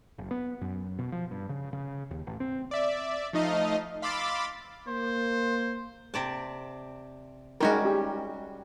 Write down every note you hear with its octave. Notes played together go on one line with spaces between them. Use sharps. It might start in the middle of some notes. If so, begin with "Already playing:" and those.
F#1
B3
F#2
B2
F3
G2
C#3
C#3
D#2
A1
C4
D5 E5
F3 A3 D#4 D#5 F5
F5 B5 C6 D6 E6 A6
A#3 C5
C3 D5 A5
G3 G#3 C#4 D#4 F#4 A#4
G4